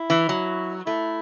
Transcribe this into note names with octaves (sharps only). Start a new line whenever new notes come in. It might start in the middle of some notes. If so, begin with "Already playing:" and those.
Already playing: E4
E3
F#3
A3 E4